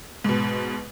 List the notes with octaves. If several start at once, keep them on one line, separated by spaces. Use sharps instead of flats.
G#2 B2